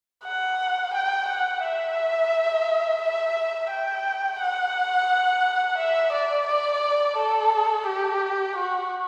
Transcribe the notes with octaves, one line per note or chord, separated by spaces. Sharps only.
F#5
G5
F#5
E5
E5
G5
F#5
E5
D5
D5
A4
G4
F#4